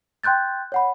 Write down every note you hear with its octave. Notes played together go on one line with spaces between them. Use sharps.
G5 C6 F#6 G6 A6
C#5 F#5 B5